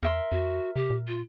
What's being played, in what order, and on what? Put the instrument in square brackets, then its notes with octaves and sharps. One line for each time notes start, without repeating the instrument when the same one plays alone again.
[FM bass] E2 [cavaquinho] A#4 E5 C6
[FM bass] F2 [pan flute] F#4
[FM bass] C3 [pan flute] G4
[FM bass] A#2
[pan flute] F4